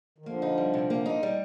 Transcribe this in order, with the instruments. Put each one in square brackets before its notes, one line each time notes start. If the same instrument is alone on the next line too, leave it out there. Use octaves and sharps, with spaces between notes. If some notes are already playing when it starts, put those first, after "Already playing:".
[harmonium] D#3
[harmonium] D3 F3 [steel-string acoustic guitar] A#3
[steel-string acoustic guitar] D#4
G3
C3
A#3
D#4
G3